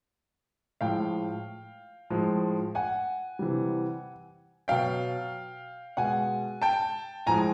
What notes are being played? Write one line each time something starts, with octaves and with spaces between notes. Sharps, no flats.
A2 F3 G#3 F5 G5
A2 F3 G#3
F#5 G#5
C3 E3 G3
B2 F#3 F5 G5
B2 G#3 F#5 G#5
G5 A5
A2 F3 G#3 G#5 A#5